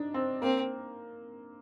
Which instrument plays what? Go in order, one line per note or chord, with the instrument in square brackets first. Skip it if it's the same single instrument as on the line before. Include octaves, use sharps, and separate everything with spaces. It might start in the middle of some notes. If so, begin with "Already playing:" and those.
Already playing: [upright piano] D4 D#4
C4
[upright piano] A#3 [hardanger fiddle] C4